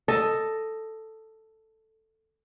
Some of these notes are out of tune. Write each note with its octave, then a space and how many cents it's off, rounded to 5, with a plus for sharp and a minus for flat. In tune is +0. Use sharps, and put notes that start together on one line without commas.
A4 +5 D#5 +0